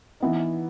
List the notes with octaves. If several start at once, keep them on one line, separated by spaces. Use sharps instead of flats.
E3 B3 D#4